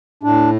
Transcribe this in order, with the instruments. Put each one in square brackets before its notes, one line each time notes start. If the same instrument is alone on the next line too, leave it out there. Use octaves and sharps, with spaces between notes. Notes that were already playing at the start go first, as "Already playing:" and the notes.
[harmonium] A2 D4